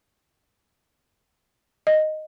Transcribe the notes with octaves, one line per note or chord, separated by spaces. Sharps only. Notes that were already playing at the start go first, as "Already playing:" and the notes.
D#5